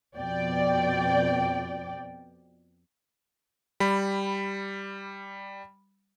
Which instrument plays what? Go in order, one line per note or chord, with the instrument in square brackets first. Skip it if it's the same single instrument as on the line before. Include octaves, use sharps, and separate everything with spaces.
[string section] F2 B2 D5 G5
[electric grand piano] G3 B5